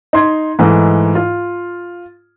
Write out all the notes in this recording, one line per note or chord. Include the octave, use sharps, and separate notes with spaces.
D#4 C6 G#6
G#2 E3 A3 D#4
F4